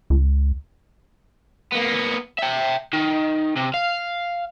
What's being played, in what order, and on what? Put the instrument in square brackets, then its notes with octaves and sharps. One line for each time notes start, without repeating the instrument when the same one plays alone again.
[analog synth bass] C#2
[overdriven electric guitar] A#3 B3
E5 G5
D#3
C3
F5